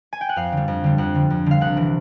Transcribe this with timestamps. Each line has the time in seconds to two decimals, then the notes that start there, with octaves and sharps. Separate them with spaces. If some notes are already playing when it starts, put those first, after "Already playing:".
0.13 G#5
0.21 G5
0.29 F#5
0.36 F2 F5
0.52 D3
0.57 G3
0.68 F2
0.84 D3 G3
0.98 F2 F#5
1.15 D3 G3
1.30 F2
1.46 D3 G3 F5
1.61 C2 F#5
1.77 C3 E3